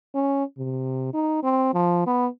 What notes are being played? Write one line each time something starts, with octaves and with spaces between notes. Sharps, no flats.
C#4
C3
D#4
C4
F3
B3